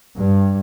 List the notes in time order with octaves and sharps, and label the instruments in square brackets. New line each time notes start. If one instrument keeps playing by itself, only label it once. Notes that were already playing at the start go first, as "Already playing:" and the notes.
[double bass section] G2